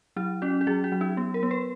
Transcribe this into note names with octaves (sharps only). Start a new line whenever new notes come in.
F#3 E4
C#4 F#4
F#4
F#3 G#4
F#4
F#3
D#4
B3
A#4
B3
B4